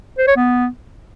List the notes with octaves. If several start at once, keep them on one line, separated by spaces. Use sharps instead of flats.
C5
C#5
B3